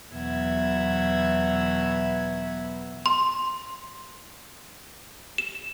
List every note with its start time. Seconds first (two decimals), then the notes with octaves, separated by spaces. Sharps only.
0.12 E2 B2 F#3 E5 F#5 G#6
3.06 C6
5.38 E7